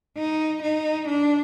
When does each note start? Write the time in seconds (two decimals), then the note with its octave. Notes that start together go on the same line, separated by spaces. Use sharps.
0.17 D#4
0.62 D#4
1.08 D4